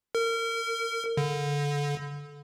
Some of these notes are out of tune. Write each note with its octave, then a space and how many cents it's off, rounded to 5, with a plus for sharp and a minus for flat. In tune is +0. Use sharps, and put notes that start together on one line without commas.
A#4 -30
D3 -25